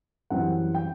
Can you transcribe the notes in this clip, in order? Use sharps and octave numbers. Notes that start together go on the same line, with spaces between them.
F#2 E3 G3 C4 F#5
G5